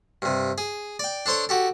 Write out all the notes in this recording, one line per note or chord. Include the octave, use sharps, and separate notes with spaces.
G2 C3
G#4
D5 G5
D4 A4 C5 C#5 C6
F#4 G4 A4